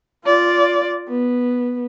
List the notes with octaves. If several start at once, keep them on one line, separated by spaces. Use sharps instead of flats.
F4 D5
B3